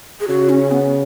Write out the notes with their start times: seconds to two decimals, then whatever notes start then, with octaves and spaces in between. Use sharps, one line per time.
0.20 G#4
0.28 C#3 F#4
0.49 C#4
0.71 B3